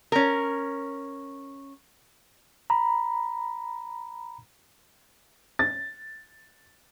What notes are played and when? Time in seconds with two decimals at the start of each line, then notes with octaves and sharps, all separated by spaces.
0.12 C#4 A#4
2.70 A#5 B5
5.59 A6